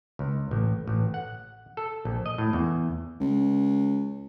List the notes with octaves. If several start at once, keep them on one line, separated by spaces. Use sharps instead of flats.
C#2
A1
A1
F#5
A4
A#1
D#5
A2
E2
C#2